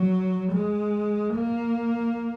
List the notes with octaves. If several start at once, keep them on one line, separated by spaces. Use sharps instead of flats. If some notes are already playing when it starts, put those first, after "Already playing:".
Already playing: F#3
G#3
A#3